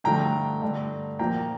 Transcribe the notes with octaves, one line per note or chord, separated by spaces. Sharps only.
G2 D3 F3 A3 G5 A#5
G2 D3 A3
A#2 F3 A#3 G5 A#5